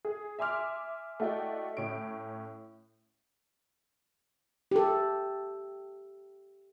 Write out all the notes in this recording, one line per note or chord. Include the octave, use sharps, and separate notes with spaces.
G#4
E5 G#5 C6 D6 F6
A3 E4 F#4 D5 D#5 G5
A2 C#4 D7
G4 A4